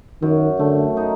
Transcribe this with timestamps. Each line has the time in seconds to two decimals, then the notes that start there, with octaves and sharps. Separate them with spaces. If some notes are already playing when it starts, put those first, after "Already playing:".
0.22 F#2 D#3
0.59 D3 A3
0.97 D#4